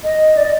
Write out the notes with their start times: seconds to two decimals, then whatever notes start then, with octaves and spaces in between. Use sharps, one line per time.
0.04 D#5
0.37 D5
0.44 D#5